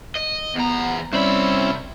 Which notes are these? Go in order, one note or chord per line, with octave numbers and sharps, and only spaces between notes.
D#5
E2 B3 A#5
C2 G3 C4 C#4 E4 B5